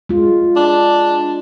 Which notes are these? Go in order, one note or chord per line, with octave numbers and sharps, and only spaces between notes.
G#3 F4
D4